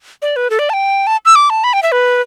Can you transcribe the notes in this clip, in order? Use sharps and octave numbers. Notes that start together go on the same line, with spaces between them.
D5
B4
A4
D5
A5
G5
A5
E6
D6
A5
B5
G5
E5
B4